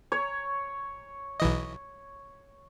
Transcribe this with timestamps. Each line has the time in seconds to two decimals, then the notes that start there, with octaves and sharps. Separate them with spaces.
0.12 C#5
1.40 B1 E3 D#5